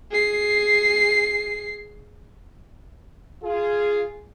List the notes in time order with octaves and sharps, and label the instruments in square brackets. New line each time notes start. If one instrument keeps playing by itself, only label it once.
[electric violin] G#4 C7
[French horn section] F4 G#4